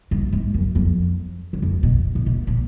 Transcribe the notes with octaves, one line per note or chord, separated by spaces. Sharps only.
G2
G#2
F#2
F2
E2
F2
B2
A#2
B2
A#2